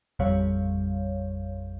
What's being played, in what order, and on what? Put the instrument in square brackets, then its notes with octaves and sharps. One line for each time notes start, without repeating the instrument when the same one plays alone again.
[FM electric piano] A1 F2 C3 G3 C#5 F5